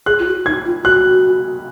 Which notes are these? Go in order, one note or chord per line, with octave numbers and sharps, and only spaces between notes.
G#4 F#6
F4
F#4
D#4 G#6
F4
F#4 F#6